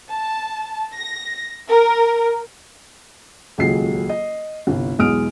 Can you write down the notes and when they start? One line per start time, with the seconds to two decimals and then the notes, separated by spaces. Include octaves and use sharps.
0.11 A5
0.96 A#6
1.69 A#4
3.58 D#1 C#2 F#3 G#4 C7
4.09 D#5
4.67 G1 C2
4.99 B1 E2 G#3 D#6 F6 D7